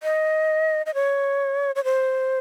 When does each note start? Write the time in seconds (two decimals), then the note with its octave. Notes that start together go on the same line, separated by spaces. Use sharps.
0.03 D#5
0.86 D#5
0.94 C#5
1.76 C#5
1.84 C5